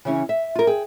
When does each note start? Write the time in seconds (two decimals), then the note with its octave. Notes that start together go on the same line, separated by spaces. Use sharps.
0.05 C#3 E3 C#4
0.29 E5
0.55 F4 A#4
0.67 G#4 G5